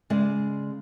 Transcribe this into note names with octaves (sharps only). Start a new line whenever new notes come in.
C#3 G#3 D5